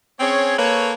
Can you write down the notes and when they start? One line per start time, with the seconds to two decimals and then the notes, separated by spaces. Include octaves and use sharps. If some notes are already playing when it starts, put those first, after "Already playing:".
0.20 C4 C#4 G#4 C#5
0.58 A#3 A4 B4 C#5